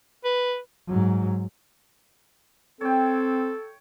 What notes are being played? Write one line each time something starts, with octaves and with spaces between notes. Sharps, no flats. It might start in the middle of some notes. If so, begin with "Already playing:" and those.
B4
G#2 F#3
C4 A4 C#5 G5